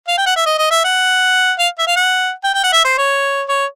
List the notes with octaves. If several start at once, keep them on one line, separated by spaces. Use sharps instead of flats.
F5
G5
F#5
E5
D#5
D#5
E5
F#5
F5
E5
F5
F#5
G5
G5
F#5
E5
C5
C#5
C#5